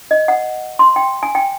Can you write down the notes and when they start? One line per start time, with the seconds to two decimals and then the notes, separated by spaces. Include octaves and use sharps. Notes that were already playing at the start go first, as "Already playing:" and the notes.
0.11 D#5
0.28 F#5
0.79 C6
0.96 G5
1.23 G#5
1.35 G5